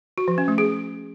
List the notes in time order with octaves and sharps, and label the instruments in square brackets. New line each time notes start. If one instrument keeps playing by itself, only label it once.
[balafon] F#4
F3
C#4
A3
G#4